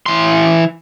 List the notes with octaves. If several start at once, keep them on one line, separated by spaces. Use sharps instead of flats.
E3 C6